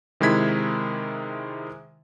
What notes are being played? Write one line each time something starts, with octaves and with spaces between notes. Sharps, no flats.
C3 D#3 G#3 E4 G#6 B6